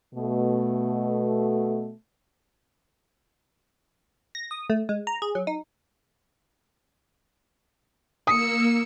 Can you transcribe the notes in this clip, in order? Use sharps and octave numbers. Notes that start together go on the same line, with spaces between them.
B2 A3
A#6
D#6
A3
G#3
A#5
G#4
F#3
D#4
A#3 D#6 E6 C#7